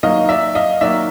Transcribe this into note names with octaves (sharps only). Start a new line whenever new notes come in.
D#3 F#3 A#3 D#5 F5
D5 E5
D#5 F5
D#3 F#3 A#3 D5 E5